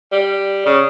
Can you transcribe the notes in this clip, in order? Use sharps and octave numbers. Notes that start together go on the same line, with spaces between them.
G3
C#3